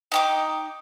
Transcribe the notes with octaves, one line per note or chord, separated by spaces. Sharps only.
D#4 G5 D6